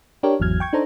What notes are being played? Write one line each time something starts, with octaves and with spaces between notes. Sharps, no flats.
D4 G4 A#4 C#5
G#1 E2 F#3 F6 G#6
G5 C#6 G#6
D4 D#4 A4 C5 A#5